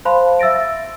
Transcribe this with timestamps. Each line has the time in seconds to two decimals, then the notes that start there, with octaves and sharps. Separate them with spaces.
0.05 C5 F5 A5 B5 C6
0.39 E5 E6 A6 A#6 D7